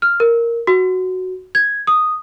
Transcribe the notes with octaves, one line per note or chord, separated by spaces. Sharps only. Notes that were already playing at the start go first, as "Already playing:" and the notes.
F6
A#4
F#4
G#6
D#6